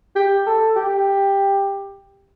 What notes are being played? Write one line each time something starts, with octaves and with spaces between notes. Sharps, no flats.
G4
A4
G4